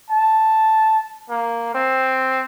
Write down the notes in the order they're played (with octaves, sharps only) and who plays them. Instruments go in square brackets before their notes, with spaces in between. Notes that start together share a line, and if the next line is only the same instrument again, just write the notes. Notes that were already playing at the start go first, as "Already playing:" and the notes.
[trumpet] A5
A#3
C4